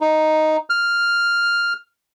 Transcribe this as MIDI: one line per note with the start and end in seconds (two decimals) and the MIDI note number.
0.01 0.57 63
0.70 1.73 89